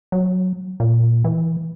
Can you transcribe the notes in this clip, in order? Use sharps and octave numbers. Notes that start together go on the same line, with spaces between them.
F#3
A#2
E3